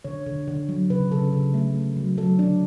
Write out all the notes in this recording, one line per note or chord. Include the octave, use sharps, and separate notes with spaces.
D3 C#5
D3
D3
F#3
C#3 B4
C#3 A4
C#3 A4
A3
A3
F#3
F#3 A4
D3 D4